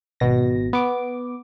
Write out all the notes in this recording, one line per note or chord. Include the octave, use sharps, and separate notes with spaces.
G#1 B2 A#6
B3 D6